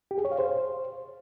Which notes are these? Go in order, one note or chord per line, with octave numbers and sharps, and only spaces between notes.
G4
G#4
C#5
F5
C5